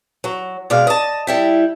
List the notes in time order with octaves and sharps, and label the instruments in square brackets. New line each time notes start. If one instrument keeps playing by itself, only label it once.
[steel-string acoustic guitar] F#3
B2 G#3 D5 F5
D#5 A5
G3 E4 G5